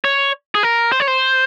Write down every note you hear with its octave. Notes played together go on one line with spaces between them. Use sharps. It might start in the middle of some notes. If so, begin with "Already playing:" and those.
C#5
G#4
A#4
C5
C#5
C5